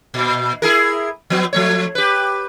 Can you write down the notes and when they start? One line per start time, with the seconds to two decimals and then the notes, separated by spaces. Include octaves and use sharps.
0.14 A#2
0.62 E4 G#4 A#4
1.30 F3 B3
1.53 F3 A3 C#5
1.95 G4 B4